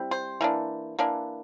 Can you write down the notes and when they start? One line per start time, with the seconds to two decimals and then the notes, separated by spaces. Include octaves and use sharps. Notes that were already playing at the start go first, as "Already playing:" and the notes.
Already playing: G3 C4 E4
0.11 C5
0.41 E3 A#3 D4
0.99 E3 A#3 D4